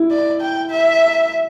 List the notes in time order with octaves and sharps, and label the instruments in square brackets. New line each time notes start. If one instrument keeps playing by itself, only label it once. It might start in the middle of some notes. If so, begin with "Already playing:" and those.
Already playing: [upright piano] E4
[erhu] D5
G5
E5